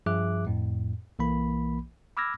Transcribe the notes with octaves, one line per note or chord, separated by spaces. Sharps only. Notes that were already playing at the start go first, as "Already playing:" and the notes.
G2 F3 G#4 E5 D6 F#6
F2 A2
B1 E3 A#3 B5
B5 D6 E6 F6 G#6 A#6